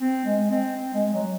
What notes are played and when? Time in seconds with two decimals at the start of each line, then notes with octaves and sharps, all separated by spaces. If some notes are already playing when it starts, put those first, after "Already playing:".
0.01 C4
0.26 G#3
0.51 C4
0.76 C4
0.94 G#3
1.14 F#3